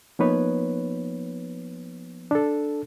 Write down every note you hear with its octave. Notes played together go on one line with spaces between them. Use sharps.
F3 A#3 B3 D#4 B4 C#5
D4 A4